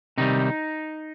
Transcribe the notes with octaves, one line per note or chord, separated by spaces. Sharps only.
C3 D#3 G3 D#4